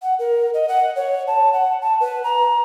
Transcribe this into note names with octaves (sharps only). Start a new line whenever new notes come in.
F#5
A#4
D#5
F#5
C#5
A5
F#5
A5
B4
A#5